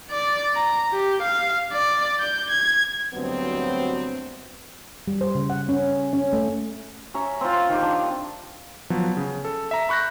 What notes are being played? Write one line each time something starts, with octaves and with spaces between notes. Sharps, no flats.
D5
A#5
G4
F5
D5
G6
G#6
D2 G2 F#3 B3 C4
G3
C5
C#3
F#5
C#4
C#4
A3
C#4 E5 A#5 C#6
C4 F4
D#3 G4
D4
F3 F#3 B3
C#3
A4
E5 A#5
B5 C#6 F#6 G6 A#6